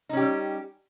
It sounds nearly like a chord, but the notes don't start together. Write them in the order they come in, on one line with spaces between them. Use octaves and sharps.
D#4 C#4 G4 G3